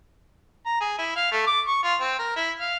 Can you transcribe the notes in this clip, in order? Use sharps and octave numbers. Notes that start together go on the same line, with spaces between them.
A#5
G#4
E4
F5
A3
D6
C#6
F4
C4
A#4
E4
F5